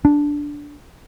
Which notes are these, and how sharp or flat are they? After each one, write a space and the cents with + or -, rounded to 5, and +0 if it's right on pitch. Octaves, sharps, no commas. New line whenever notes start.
D4 -5